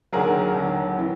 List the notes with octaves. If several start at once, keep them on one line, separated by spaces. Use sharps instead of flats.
D#2 D3 F#3 G#4 A#4
D#2 D3 F#3
E3